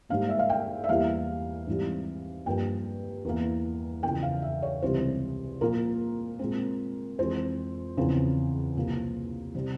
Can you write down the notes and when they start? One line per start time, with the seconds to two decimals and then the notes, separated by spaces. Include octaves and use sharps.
0.09 G#2 G3 A#3 F5
0.29 E5
0.39 F5
0.49 G5
0.84 E5
0.89 E2 E3 G3 A#3 F5
1.67 G#2 E3 G3 C4
2.46 G2 F3 A#3 G5
3.25 E2 E3 A#3
4.03 E2 C#3 F3 G5
4.23 F5
4.42 E5
4.62 C#5
4.82 C#2 C3 E3 G3 C4 C5
5.61 A#2 F3 A#3 A#4
6.39 A#2 G#3 C4
7.18 F2 E3 G#3 C4 C5
7.97 E2 C#3 F3 C4
8.76 C2 A#2 F3 A#3
9.54 C3 G3 C4